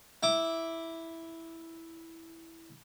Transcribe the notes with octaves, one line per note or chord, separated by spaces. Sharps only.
E4 D6